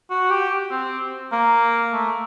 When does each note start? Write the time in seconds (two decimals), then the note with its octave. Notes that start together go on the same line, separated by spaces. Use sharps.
0.11 F#4
0.30 G4
0.71 C4
1.32 A#3
1.93 A3